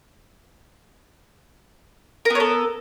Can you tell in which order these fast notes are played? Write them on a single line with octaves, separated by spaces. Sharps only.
A#4 B3 C#5 A4